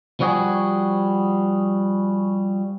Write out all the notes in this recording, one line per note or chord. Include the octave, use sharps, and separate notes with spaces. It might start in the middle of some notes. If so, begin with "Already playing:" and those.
F3 G3 F#4 G#4